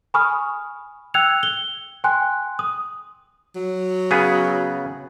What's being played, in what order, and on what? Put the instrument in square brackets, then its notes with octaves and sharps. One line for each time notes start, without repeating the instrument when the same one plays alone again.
[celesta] G#5 B5 C#6 D#6 F6
G5 E6 F#6 G#6 C#7 F7
G7
G5 G#5 C6 F#6
D#6
[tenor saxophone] F#3
[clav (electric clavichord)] C#3 B3 G#4